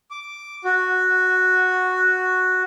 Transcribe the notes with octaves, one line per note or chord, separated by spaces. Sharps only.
D6
F#4